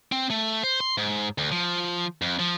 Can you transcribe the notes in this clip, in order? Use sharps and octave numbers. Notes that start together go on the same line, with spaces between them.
C4
A3
C5
C6
G#2
D2
F3
F2
F3